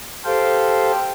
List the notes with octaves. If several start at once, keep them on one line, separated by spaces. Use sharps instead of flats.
G4 A4 C5 F5 G5